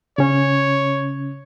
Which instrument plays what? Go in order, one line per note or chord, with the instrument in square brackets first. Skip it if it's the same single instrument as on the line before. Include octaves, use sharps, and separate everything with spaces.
[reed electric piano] C#3 C#4 [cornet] C#5